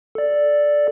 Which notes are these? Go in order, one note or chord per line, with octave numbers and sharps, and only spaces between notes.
A4 D5